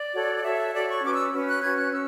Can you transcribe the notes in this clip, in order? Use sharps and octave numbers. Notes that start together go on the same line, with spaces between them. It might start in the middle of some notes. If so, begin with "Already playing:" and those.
Already playing: D5
F#4 A4 C#5
F#4 A4 C#5 E5
F#4 A4 C#5 D5
C#6
C#4 F#4 B4 D6
E6
C#4 F#4 B4
F#6
C#4 F#4 B4 G#6
F#6
C#4 E6